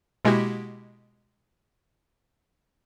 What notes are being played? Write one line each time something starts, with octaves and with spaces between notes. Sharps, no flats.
B2 G#3 A#3 E4 F#4 G4